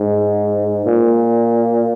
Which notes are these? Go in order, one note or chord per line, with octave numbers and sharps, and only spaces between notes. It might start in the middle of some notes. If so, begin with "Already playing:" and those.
Already playing: G#2
A#2